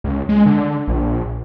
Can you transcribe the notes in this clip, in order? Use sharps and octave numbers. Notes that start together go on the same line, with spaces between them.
C#2
G#3
D3
A#1